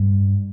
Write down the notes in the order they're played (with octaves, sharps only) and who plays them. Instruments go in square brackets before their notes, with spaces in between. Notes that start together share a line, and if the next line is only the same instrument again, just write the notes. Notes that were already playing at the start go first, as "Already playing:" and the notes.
Already playing: [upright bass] G2